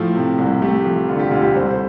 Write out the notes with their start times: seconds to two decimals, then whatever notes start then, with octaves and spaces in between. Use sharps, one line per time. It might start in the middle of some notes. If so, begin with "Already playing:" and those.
Already playing: A2 F3 A3
0.16 C3
0.38 C2
0.62 A3 G4
0.85 F3
1.08 D3 F4
1.19 G4
1.31 D2 F4
1.43 G4
1.54 C2 C5
1.71 C5